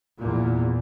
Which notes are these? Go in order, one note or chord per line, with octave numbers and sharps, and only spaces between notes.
E2 A#2